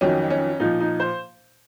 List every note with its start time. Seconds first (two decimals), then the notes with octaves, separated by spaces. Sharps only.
0.01 F2 D#3 F#3 C#4
0.30 C#4
0.60 A#2 F3 D#4
0.80 D#4
1.00 C5